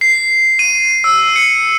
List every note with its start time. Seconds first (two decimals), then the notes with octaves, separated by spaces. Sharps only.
0.01 C7
0.59 D#7
1.04 E6
1.36 C#7